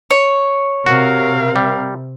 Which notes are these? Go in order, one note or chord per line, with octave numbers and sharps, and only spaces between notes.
C#5
C3 F#4 A#4 F5
G3